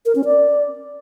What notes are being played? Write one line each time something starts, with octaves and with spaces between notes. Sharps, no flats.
A#4
C#4
D5